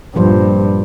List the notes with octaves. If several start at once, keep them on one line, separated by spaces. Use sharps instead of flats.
G2 A#2 F3 C5